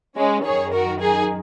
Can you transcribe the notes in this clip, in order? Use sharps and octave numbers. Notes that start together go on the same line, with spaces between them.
G#3 C#4
F#2 D#3 G#4 C#5
F#4 A#4
D#4 G#4